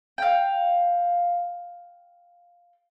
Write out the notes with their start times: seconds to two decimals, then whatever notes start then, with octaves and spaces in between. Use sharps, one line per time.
0.18 F5 G5